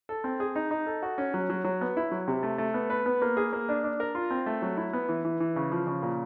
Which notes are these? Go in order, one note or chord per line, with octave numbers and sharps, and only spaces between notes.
A4
C4
G#4
D#4
D#4
A4
F#4
C#4
F#3
F#3
F#3
B3
E4
F#3
C3
A3
A3
B3
B4
B3
A#3
G#4
A#3
D4
D4
A#4
F4
C4
A3
F#3
E4
B3
E3
E3
E3
C#3
F3
C#3
A#2